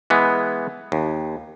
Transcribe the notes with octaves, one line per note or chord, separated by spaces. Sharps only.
E3 G#3 B3
D#2